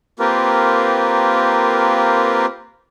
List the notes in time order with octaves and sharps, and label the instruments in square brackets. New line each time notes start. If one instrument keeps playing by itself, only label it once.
[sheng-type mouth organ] A#3 C4 F4 G4 A#4 B4